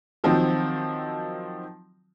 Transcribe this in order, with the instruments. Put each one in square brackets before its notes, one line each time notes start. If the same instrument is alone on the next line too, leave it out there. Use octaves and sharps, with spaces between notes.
[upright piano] D#3 F3 F#3 C4